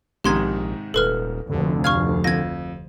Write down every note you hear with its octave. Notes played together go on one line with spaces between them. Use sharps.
A#1 G#2 C3 D#3 G4 C6 G#6
D#1 A4 B4 F6
F1 D2 D3
F5 C#6 F6 G#6
F2 G#6 A#6